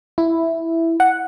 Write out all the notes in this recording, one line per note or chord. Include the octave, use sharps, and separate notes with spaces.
E4
F#5